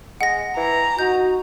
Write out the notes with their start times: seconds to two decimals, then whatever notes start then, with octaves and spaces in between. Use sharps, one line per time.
0.21 G#3 F#5 A#6
0.56 E3 A#5
0.99 D#4 F#4 G6